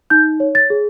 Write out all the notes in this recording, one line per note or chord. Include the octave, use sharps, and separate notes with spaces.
D#4 G6
C#5
A6
G#4